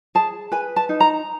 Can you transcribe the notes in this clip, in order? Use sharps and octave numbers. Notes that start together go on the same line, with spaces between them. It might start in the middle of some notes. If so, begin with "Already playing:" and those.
G#4 A5
B4 G#5
A5
D#4
A#5